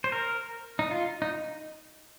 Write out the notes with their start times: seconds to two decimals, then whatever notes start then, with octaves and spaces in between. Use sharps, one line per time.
0.04 C5
0.12 A#4
0.79 D#4
0.91 F4
1.22 D#4